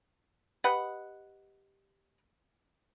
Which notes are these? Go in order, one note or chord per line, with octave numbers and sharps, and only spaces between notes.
G4 B4 D#5 F#5